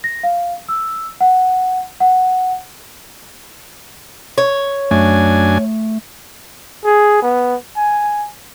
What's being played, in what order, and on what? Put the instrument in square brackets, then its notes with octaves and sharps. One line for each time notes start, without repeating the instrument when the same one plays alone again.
[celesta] A#6
F5
E6
F#5
F#5
[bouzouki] C#5
[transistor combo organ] F#2 D4 G#5 [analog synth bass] A3
[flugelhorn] G#4
B3
G#5